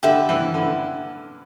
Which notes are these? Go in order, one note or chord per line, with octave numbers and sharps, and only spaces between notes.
D3 G4 B4 E5 B5
E3
D3